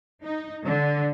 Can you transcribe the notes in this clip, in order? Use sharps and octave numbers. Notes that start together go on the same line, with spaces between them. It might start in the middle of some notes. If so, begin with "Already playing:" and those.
D#4
D3